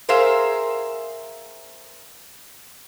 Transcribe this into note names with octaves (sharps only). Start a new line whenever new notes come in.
G#4 A#4 C5 E5 F5